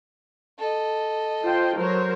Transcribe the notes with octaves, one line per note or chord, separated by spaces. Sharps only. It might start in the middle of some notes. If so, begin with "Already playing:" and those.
A4 D#5
F4 C5 G5
F#3 A#4 C5 C#5